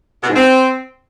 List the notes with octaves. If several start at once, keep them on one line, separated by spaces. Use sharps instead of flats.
B2
G#2
C4